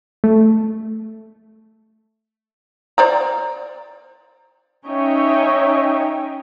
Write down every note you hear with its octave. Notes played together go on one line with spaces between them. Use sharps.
A3
C5 D5 A#5
C#4 D#4 C#5 D#5 E5 G5